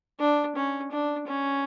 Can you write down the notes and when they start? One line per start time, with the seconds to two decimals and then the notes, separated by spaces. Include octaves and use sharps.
0.20 D4
0.56 C#4
0.91 D4
1.27 C#4